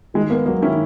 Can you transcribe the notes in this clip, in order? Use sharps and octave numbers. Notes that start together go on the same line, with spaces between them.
D#3 G#3
A#3 B3
F#3 A#3
D#3 C#4 E4